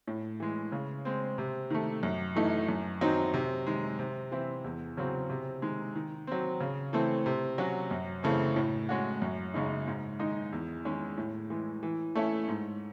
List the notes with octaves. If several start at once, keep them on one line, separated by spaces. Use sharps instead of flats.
A2
E3 G#3
C#3
G#3 C4
C3
D#3 A3
F#2
E3 A3 D#4
F#2
D#3 F#3 C4 D#4
C3
D#3 G#3
C3
E3 C4 E4
E2
C#3 F#3 C4
C3
D#3 G#3
D#3
F#3 C4
C#3
E3 A3 C4
C3
F#3 C#4 F#4
F#2
C#3 E3 A3 C4
A2
G#3 C#4 F#4
F#2
C#3 G#3 D#4
G#2
D#3 G#3 D#4
E2
D#3 G#3 C#4
A2
E3 G#3
E3
A3 C#4 E4
G#2